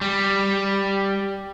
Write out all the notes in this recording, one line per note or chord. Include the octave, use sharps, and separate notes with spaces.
G3